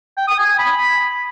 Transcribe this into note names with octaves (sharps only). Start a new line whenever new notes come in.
G5
D#6
G#5
G#5
B5